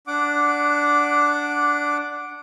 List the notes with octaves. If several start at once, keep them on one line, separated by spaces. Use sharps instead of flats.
D4 F#5 D6